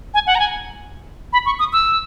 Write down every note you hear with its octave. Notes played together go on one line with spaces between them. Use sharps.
G#5
F#5
A#5
G#5
B5
C#6
D#6
E6